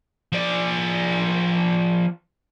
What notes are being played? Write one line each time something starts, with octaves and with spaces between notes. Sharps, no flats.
F3 D5